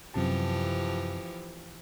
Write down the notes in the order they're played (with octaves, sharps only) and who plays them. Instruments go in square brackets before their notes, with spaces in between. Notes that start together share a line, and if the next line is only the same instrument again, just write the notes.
[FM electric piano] F#2 C3 A5 [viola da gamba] E3 F3 G4